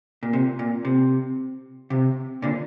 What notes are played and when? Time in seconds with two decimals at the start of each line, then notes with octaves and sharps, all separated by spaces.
0.23 A#2
0.33 C3
0.59 A#2
0.85 C3
1.90 C3
2.42 A#2 D3